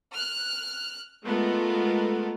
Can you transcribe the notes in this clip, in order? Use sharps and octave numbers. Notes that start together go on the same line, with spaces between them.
F6 F#6
G#3 A3 B3 F4 A4 A#4